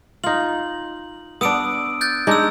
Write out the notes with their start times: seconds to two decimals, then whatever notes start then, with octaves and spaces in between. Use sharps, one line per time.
0.24 D#4 F4 F#7
1.41 B3 D4 D#6 E6 D7
2.01 F#6 G6 A6
2.27 G#3 D4 D#4 E6 G#6